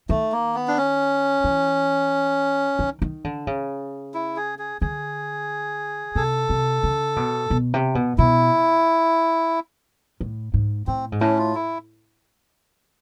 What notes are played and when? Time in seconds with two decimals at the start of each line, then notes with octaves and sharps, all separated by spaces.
0.09 D#3 A3
0.32 A#3
0.55 B3
0.68 D4
0.78 C#4
1.44 E3
2.79 D#3
3.02 D#3
3.24 D3
3.47 C#3
4.14 E4
4.36 G#4
4.59 G#4
4.81 D3 G#4
6.15 C3 A4
6.49 C3
6.83 C#3
7.16 B2
7.50 B2
7.74 C3
7.95 B2
8.18 B2 E4
10.21 A2
10.54 G#2
10.87 A2 C4
11.12 G#2
11.21 A2 C#4
11.38 F4
11.55 E4